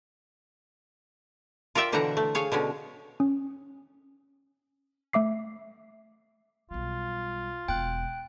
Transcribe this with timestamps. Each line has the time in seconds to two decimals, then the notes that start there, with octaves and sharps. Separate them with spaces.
1.75 F4 A#4 D5 E5 G5
1.92 B2 D3 E3 C5 F#5 A#5
2.17 A3
2.35 G#4 C#5 F5
2.52 B2 D3 G#3 C#4
3.20 C#4
5.13 A3 E5 D6 C7
6.71 B1 G3 F4
7.68 E1 B3 G5 F#6